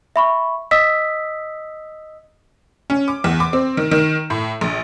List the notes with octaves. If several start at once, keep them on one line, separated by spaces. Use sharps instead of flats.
E5 B5 C#6
D#5 D#6 E6 B6
C#4
D6
E2
D6
C4
D#3
D#3
A2
A#1